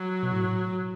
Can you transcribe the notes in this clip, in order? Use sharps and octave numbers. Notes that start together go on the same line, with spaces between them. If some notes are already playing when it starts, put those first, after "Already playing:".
Already playing: F#3
B2
A2